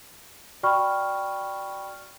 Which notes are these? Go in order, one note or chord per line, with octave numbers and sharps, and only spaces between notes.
F#4 D5 G5 B5 C#6 F6